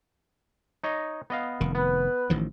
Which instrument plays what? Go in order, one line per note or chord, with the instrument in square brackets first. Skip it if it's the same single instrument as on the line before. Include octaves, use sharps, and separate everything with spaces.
[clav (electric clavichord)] D#4 C#5 D#5
B3 D#5 F5
[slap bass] F1 D#3
[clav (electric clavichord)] B3 [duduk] B4
[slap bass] A1 D#3 F3